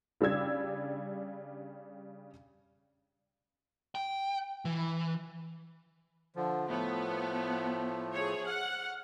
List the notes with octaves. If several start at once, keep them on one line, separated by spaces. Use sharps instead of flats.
C#3 G3 D4 E6 G#6
G5
E3
D3 F3
A2 F3 A3 B3
G#4 C#5
F#5 F6